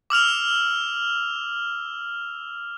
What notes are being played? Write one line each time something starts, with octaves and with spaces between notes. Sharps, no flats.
D6 E6 F6 F7